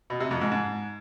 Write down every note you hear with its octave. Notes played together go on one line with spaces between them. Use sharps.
B2
C3
F2
G#2
G#2